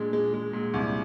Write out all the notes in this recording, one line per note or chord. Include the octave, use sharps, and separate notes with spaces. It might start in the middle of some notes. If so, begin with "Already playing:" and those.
Already playing: A#2 G#3 D4
G#3
G#3
A#2
C2